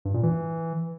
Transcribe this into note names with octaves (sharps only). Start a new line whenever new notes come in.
G2
A#2
E3